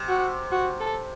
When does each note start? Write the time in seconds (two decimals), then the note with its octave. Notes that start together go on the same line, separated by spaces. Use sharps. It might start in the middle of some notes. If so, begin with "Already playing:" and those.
Already playing: C3
0.08 F#4
0.52 F#4
0.80 A4